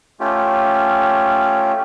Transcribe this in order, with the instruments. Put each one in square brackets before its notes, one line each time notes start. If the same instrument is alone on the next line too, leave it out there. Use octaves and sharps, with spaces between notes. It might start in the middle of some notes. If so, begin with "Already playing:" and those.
[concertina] A3 C#4 F4 G4